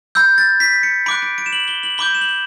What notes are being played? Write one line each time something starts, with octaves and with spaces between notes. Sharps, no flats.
B5 E6 G6
A6
B6
C#7
B5 D6 F#6 D7
D7
D7
E7
F#7
G7
F#7
B5 D6 G6 G7
E7
F#7